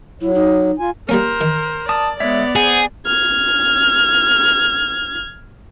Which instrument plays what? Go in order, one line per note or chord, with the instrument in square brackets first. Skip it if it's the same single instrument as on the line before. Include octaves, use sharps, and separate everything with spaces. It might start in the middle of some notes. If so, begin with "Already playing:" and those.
[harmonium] F#3 [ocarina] E4
[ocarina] D#4
[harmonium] F4 G#5
[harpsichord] G3 A#3 C#4 [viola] A#4 C5
[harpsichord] D#3
[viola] D5 [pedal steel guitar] A5 D#6
[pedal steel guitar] G#3 C#5 E5 [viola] B3 D5
[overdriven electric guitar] G#4 [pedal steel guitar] C5 F#5
[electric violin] F6 G#6